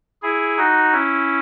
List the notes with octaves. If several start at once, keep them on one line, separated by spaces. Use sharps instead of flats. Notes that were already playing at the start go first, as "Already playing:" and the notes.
E4 G#4
D#4 F#4
C#4 E4